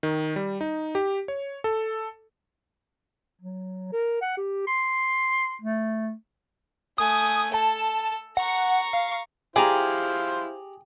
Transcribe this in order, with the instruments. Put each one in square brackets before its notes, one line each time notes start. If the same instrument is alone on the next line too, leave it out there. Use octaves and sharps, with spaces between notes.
[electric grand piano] D#3
G3
D#4
G4
C#5
A4
[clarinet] F#3
A#4
F#5
G4
C6
A3
[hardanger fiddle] A3 G#5 [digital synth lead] D#6
[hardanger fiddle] A4 [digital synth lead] A5
[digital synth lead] F#5 [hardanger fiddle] A#5 C#6
[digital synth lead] F5
[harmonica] E4 C5 F5 [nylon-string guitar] G4 [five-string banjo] G#4 [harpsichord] D5 G#5 A#5